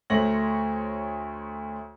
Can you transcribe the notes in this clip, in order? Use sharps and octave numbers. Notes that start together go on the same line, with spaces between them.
D2 A3 C5 C#5 A#6 F#7